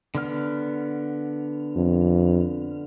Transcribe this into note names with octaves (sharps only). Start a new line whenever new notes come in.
D3 B3 F6
F2